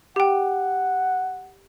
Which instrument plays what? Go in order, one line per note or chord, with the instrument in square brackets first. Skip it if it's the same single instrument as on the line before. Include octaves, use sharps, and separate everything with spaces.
[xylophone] G4 G5 [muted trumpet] F#5